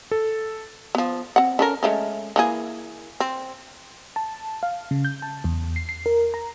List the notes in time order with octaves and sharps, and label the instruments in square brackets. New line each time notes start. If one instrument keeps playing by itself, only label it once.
[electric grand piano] A4
[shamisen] F3 B3
C4 F#5
C#4 A4 A#4
G#3 A3 C#4
E3 A#3 G#4
C4
[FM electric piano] A5
F5
C#3
G6
A5
E2
C7
C7
A#4
A#5